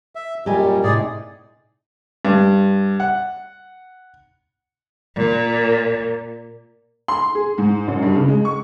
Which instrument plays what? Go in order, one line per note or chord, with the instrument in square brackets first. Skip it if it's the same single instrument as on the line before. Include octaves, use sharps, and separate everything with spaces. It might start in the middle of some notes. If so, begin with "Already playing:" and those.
[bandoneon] E5
[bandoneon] F#2 A#2 G3 [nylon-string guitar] G4 D#5 G#5
[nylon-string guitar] A2 C3 D#4 [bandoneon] G#4 D5
[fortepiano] G2
F#5
[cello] A#2
[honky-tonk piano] C6
G#4
G#2
F#2
G2
C#3
G#3
C#6